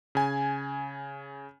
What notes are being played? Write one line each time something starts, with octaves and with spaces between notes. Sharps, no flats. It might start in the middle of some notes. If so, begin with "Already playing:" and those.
C#3 G#5